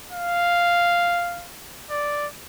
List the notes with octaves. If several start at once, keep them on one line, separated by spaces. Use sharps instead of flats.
F5
D5